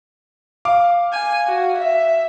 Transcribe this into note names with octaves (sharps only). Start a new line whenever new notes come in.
F5 D6
G#5
F#4
E5